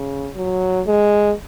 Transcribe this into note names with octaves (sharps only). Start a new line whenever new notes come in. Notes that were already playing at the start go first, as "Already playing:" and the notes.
Already playing: C#3
F#3
G#3